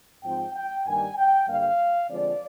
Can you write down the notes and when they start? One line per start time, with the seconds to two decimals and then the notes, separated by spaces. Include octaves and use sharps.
0.23 G#2 F3 G#3 C4 G5
0.55 G5
0.86 G2 D#3 G3 A#3 G#5
1.17 G5
1.47 G2 D3 G3 A#3 F5
2.09 D3 F3 G#3 C4 D5